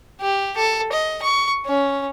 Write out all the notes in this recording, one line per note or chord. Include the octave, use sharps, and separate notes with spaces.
G4
A4
D#5
C#6
C#4